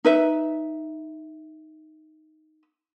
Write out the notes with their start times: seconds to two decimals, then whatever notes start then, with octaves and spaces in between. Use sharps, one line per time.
0.05 D#4 B4 E5